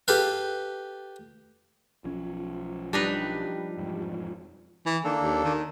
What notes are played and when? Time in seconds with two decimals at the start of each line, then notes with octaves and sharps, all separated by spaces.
0.08 G4 A4 B4 F5
2.04 B1 F3 C#4
2.93 G3 D4 D#4 B4
3.77 E1 F2 G#2
4.86 E3
5.04 D#3 A#3 D4 A4
5.22 D#2
5.44 D#3